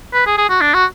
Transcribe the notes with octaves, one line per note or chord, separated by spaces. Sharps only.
B4
G#4
G#4
F#4
D4
F#4